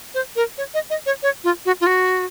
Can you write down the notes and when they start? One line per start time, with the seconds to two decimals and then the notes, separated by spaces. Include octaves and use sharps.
0.14 C5
0.36 A#4
0.58 C#5
0.74 D#5
0.90 D#5
1.06 C#5
1.23 C#5
1.44 F4
1.65 F#4
1.81 F4
1.86 F#4